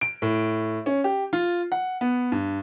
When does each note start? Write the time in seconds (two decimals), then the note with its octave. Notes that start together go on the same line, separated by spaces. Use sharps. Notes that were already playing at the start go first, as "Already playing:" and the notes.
0.01 D7
0.22 A2
0.86 C#4
1.04 G4
1.33 F4
1.72 F#5
2.01 B3
2.32 G2